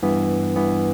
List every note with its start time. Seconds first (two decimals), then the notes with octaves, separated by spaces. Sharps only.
0.03 G2 E3 B3
0.56 G2 E3 B3